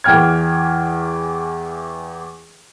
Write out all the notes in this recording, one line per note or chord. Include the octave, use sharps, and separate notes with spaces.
E2 E3 G5 F6 G#6